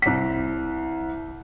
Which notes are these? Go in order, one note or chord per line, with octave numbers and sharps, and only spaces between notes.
C2 B6